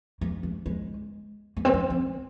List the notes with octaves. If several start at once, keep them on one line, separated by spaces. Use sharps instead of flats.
A#3
D4
G#3
A#3
C4
A#3
C4